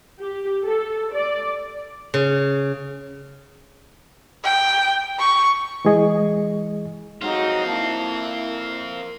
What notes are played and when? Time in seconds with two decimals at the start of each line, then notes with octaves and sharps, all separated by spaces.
0.20 G4
0.65 A4
1.14 D5
2.14 C#3
4.44 G5
5.19 C#6
5.85 E3 G#3 G#4 D#5
7.21 F#3 G#3 C4 D#4 F4 F#4
7.67 A#3 E4 A5
8.44 A#4